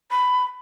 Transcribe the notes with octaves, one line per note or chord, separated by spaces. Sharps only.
B5